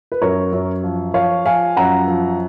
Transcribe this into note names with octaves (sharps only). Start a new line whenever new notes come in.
B4
F#2 A#4 C#5
F#2
F3
F3 C#5 F5
F3 F5 G#5
F#2 F#5 A#5
F3